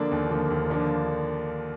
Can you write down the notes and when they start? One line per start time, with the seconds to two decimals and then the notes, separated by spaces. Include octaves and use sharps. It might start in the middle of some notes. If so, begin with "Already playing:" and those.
Already playing: D3 F3 A#3 D4
0.11 D#2
0.30 D3 F3 A#3 D4
0.50 D#2
0.70 D3 F3 A#3 D4